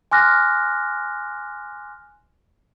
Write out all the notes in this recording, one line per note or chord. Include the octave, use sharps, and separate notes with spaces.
G#5 C6 D6 F6 F#6 A#6